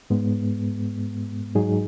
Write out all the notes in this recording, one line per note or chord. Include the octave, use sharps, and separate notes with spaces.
G#2 G#3 B3
G#2 F#3 D#4 G#4